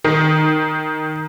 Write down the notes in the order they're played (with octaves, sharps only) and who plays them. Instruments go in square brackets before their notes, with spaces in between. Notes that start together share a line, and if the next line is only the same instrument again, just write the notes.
[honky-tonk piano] D#3